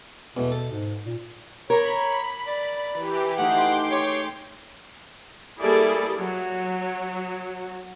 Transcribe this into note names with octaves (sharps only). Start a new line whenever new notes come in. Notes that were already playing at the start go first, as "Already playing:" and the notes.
E2 B2 A3
A4
G#2
A#2
A#4 C#5 A#5 B5 D6 G#6
D5
E3 G4 B4
A3 D#4 G#4 F#5 G5 C6 D6
C#5
G3 A#3 E4 G#4 A4 D5
F#3